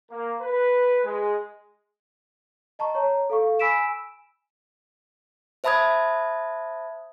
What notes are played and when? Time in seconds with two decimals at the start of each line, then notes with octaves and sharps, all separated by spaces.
0.11 A#3
0.41 B4
1.04 G#3
2.79 D#5 A5 A#5 C#6
2.95 C#5 A#5
3.30 A4 F5 C#6
3.59 G#5 B5 E6 B6 D7 E7
5.64 C5 E5 A5 B5 D#6 G#6